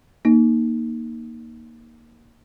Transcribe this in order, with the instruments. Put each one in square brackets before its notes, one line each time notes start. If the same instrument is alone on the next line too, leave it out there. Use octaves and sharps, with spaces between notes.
[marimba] A#3 D#4